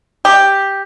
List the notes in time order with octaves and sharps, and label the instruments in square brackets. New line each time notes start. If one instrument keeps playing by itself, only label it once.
[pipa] G4